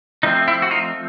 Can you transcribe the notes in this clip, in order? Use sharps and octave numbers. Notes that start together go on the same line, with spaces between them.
F3 A3 C4 D#4
E4
F#4
D#4 F4